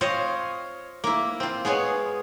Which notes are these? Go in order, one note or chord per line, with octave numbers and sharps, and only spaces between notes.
C4 F4 C5 C#5 D#5
A#3 E4
C4 F4
G#3 B3 G#4 C#5